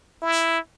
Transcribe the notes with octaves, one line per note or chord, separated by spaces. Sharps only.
E4